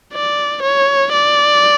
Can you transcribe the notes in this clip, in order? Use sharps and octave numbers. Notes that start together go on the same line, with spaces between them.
D5
C#5
D5